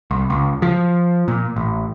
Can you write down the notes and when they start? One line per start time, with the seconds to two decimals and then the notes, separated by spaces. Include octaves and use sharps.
0.11 C2
0.30 C#2
0.62 F3
1.28 A#2
1.56 A1